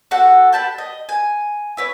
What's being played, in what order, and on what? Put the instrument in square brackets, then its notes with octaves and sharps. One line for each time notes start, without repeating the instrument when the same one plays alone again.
[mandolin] F#4 A4 F#5
G5 A5 B5
D#5
G#5
E4 B4 C#5